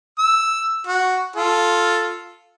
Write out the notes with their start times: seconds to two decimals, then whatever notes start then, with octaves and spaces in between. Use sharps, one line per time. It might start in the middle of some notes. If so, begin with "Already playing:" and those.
0.18 E6
0.87 F#4
1.36 F4 A4